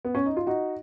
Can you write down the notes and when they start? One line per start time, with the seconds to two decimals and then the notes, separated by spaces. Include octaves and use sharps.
0.05 B3
0.15 C#4
0.26 D#4
0.37 F4
0.47 D#4 F#4